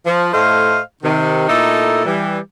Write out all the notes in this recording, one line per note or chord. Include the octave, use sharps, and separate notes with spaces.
F3
A2 A3 C5 D#5 F5
C3 D#3
A#2 A3 D#4 E4 A4
E3 G3